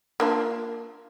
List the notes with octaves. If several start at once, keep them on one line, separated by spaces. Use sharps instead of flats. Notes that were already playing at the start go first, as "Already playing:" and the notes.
A#3 D4 F4